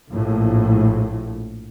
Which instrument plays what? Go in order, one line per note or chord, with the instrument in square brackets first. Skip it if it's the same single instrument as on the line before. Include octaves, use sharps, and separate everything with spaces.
[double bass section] A#1 A2